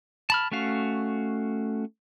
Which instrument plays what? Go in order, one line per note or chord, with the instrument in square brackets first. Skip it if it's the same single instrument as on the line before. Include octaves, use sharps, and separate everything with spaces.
[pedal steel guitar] A5 B5 F6
A3 C#4 F#4 F5